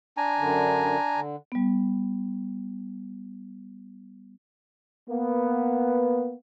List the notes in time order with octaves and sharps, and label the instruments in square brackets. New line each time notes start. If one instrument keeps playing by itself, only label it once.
[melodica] D4 G#5 A#5
[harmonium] F#2 D3
D3
[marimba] G3 B3
[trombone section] A#3 B3